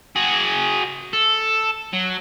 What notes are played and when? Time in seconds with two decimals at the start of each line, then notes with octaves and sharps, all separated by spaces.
0.16 F#4 G#4
1.13 A4
1.93 F#3